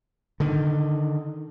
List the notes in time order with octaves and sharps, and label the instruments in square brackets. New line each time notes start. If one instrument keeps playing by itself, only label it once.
[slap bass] D3 D#3